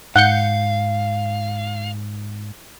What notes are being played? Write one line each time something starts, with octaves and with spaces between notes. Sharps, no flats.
G#2 F5 F#5 G6 C#7